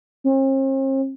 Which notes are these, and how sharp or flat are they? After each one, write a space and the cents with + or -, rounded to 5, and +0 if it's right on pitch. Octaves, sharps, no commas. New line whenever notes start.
C4 +45